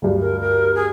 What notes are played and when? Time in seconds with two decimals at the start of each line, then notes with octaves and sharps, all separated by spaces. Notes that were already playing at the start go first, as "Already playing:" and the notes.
0.02 D2 G2
0.20 A#4
0.40 A#4
0.75 G#4